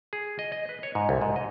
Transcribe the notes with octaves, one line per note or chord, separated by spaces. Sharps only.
G#4
D#5
D#5
B4
C#5
G#2
C2
G#2
D#5